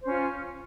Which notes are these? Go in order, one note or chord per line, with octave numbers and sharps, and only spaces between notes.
C#4 F4 C5